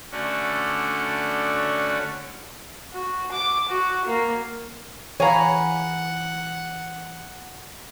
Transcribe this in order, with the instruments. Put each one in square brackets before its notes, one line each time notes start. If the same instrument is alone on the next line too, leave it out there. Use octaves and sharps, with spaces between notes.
[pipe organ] D3 A3 C#4 D4 F#4
[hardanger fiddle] F#4
D6
F#4
A#3
[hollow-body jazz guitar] E3 G#4 F5 [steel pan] C#5 [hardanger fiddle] F#5 [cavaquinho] G#5 A#5 B5